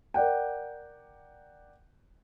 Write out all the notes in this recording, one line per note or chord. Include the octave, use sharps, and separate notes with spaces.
A#4 D5 F#5 G5